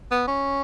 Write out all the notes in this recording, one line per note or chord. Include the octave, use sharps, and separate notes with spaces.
B3
C#4